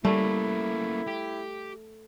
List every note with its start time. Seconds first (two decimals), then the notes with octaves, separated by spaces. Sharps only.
0.05 G3 A3 A#3 C#4 E4
1.07 G4